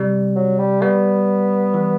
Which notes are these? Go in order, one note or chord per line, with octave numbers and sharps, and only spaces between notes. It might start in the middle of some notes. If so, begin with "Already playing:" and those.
Already playing: C3 G3
F#3
G3
G3 B3
E3